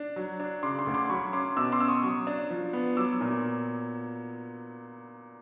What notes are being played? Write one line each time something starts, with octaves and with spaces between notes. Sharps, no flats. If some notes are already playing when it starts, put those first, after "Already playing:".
Already playing: D4
F#3
D4
C#3 C6 D6
C6 D6
D2
C6 D6
F#3 B5 C#6
C#4 C6 D6
B2 D6 E6
C6 D6
C#4 E6
C#6 D#6
F#3 C#6 D#6
D4
F3
B3
F#3 D6 E6
A#2